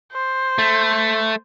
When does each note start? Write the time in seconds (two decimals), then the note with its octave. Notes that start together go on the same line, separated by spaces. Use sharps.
0.12 C5
0.58 A3